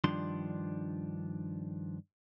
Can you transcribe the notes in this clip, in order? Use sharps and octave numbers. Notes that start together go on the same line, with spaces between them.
G2 D#3 F3 D4 C6